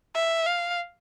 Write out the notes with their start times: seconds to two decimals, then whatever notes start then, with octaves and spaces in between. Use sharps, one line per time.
0.15 E5
0.46 F5